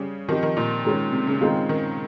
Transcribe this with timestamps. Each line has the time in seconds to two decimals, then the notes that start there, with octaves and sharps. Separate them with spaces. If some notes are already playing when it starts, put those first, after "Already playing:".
Already playing: C#3 G3 C#4 G4
0.28 D#3 F3 C4 D#4 G4
0.43 D#3
0.57 A#2
0.85 D#3 G#3 C#4
1.13 C3
1.27 C#3
1.41 D#3 G#3 C4 F4
1.69 D#3